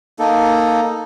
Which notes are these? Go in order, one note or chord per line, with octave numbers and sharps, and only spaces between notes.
A#3 D#4 A4